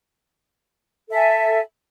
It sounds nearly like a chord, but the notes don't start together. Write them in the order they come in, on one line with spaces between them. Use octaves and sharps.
A4 E5 G#5